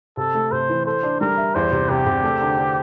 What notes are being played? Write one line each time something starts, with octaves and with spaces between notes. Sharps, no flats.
C3 A4
A3
C3 C5
E3
A4 C5
D4
G3 A#4
E5
E2 C5
C3
C3 G4
C3
A3
D3
D3